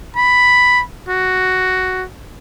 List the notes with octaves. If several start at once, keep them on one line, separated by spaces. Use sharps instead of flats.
B5
F#4